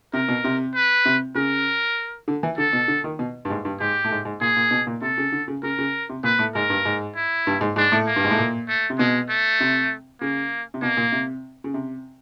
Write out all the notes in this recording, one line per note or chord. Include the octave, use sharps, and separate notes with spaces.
C3 A#4
B2
C3
B4
C3
C#3 A#4
D3
E3
D3 A4
B2
D3
D#3
B2
G2
G#2
G2
G#2 G4
A2
G#2
G#2
A#2 G#4
A#2
B2
A#2
C3 A4
C#3
D3
C#3
C#3 A#4
C#3
C3
A#2 B4
A2
G#2 A#4
G2
G#2
E4
G2
G#2
G#2 D4
A2
A#3
G2
G#2
A2
A#2
A3
C3
B2 G#3
A3
C3
C#3 A#3
C3
B2 A#3
A#2
C3
C#3
C3